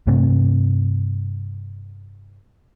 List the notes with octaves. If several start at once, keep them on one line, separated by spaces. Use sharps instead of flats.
G2 C3 A3 C4